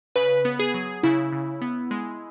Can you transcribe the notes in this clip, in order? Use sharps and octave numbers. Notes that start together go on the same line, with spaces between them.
C#3 B4
B3
G#4
F#3
C#3 E4
C#3
B3
G#3